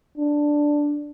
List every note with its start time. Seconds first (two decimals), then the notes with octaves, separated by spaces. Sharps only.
0.18 D4